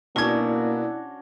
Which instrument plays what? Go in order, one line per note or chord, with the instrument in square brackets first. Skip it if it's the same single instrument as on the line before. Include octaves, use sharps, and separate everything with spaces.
[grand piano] B2 G#6 [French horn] A#3 [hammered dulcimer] C#4 D4 F#4 [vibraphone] E4 D5